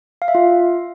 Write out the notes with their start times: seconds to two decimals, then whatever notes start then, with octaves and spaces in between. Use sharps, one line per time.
0.22 F5
0.28 E5
0.35 F4